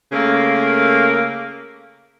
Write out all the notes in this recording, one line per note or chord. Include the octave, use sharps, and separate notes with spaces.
C#3 A3 A#3